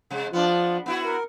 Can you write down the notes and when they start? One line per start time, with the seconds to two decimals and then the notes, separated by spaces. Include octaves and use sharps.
0.11 C3 G#3
0.33 F3 B3 D4 F4
0.86 B3 E4 F#4
1.05 A#4